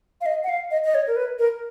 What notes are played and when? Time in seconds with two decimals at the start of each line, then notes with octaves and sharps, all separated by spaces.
0.21 F5
0.26 D#5
0.44 F#5
0.49 F5
0.71 D#5
0.84 D#5
0.95 C#5
1.07 A#4
1.16 B4
1.39 A#4